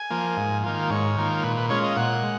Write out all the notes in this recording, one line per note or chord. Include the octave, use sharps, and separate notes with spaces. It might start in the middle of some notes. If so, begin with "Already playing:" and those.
Already playing: G#5
F3 A#3
G#2
D#3 A#3 F4
G#2 C#5
D#3 A#3 F4
A#2 B4
B4
G#3 C#4 F4 C#5
D#5
A#2 F#5
G#3